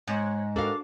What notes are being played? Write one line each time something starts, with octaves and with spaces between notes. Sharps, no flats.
G#2 C#5 F#5
D4 F#4 A4 A#4 F5 D6